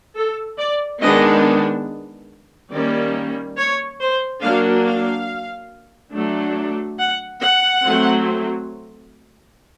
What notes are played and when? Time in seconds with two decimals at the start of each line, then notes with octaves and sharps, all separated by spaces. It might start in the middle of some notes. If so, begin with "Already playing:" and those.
0.15 A4
0.58 D5
1.01 D#3 G#3 B3 D4 D#5
2.71 D#3 G3 A#3 C#4 D5
3.57 C#5
4.00 C5
4.42 F#3 A#3 D4 F5
4.85 F5
6.13 F#3 A3 D4
6.98 F#5
7.41 F#5
7.83 F#3 A3 C4